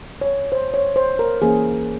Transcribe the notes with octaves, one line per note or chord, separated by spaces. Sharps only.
C#5
C5
C#5
C5
A#4
E3 A#3 C#4 G#4